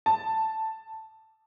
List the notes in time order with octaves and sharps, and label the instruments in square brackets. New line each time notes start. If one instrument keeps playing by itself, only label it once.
[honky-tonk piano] A5